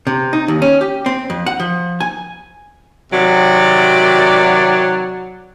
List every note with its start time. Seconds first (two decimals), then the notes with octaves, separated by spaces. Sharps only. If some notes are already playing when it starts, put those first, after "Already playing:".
0.07 C3
0.33 D#4
0.48 D#2
0.62 C#4
0.81 G4
1.06 C4
1.30 F2
1.46 F#5
1.60 F3
2.00 G#5
3.12 C3 D#3 F#3 D5